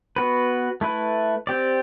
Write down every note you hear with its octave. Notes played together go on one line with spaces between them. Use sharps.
B3 F#4 B4
A3 E4 B4
C4 G4 D5